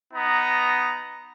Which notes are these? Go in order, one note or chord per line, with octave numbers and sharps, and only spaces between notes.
B3 D#4 A#5